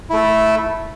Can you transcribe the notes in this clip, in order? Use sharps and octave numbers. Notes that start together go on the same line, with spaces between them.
A3 E4 A4